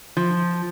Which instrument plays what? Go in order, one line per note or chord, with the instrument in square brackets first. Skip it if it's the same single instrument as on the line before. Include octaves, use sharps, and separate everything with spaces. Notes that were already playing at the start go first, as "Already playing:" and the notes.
[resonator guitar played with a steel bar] F3